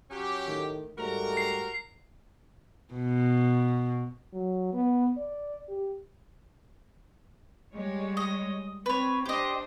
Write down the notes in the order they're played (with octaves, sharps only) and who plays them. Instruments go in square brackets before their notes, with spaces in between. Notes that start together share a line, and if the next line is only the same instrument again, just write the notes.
[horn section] F#3 C#4 G4
[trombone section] A2 D#3
[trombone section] G#2 G3 A3 [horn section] F#4 A#4 A#5
[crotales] C7
[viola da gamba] B2
[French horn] F#3
B3
D5
G4
[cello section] G3 G#3 C#5
[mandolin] D#5
[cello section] C4 [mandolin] B4 C#5
[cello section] D4 C5 [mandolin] G4 D#5